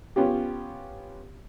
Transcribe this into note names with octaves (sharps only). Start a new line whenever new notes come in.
B3 C#4 F4 G4